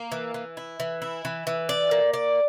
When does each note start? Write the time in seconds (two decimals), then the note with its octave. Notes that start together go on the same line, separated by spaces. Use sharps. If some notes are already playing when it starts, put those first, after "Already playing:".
Already playing: A#3
0.12 E3
0.34 E3
0.57 E4
0.80 E3
1.02 E4
1.25 E3
1.47 E3
1.69 D5
1.91 A#3
2.13 D5